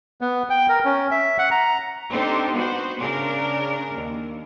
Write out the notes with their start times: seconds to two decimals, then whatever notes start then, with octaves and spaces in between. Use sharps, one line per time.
0.21 B3
0.50 G5
0.69 A#4
0.85 C#4
1.11 E5
1.39 F#5
1.51 A#5
2.10 C4 D4 D#4 G4 A4 C5
2.53 B3 F#4 C5
3.00 C#3 D4 A#4
3.95 D#2